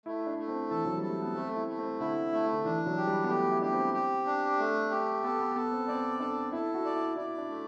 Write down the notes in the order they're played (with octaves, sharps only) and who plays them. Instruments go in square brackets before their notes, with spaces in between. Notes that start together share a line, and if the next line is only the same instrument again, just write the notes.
[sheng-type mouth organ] A3 [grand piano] E4
[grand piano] D4
[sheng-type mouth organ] A3
[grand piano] C4
[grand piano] E3 [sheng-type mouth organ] A4
[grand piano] F#3
[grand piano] G3 [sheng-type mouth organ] A4
[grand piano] A3
B3
[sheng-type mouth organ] A3 [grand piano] C4
[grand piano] E4
[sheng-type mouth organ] A3
[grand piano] C4
[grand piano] D3 [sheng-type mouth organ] E4
[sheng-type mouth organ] A3
[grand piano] D3
[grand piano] E3 [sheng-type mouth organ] D4
[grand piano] F#3
[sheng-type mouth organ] G4
[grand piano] G3
B3
[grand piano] A3 [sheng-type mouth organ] G4
[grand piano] E4
[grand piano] D4 [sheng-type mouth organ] G4
[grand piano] C4
[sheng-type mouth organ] G4
D4
A3
G4
[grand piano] B3 [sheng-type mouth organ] A4
[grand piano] B3
[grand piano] B3 [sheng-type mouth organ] A4
[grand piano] C4
[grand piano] C4 [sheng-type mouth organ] D5
[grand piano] D4 [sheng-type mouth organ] A4
[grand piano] E4 [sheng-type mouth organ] A4
[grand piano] F#4
[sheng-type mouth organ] D5
[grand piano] E4
[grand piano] E4 [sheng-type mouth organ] D5
[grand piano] D4
[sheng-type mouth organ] A3